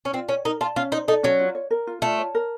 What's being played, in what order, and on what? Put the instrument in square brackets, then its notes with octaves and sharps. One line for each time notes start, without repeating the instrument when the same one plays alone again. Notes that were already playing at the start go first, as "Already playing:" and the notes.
[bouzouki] C#4
[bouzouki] C4 [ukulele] F4
[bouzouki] C#4 [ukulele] C#5
[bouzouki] D#4 [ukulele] A#4
[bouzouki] F4 [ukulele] A5
[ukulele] C#4 [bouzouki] F4
[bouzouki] D#4 [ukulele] C5
[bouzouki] D#4 [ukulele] A4
[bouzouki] F#3 [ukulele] C#4
[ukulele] F4
C#5
A#4
F4
[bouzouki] A3 [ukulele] F4
[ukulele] C#5
A#4